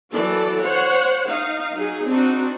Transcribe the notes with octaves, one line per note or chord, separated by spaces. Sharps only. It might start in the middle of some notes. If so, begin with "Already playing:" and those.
E3 F#3 A4 D5
C5 C#5 F#5
D#4 F5
F#3 D#4 G#4
C4 D4 D#4 F#4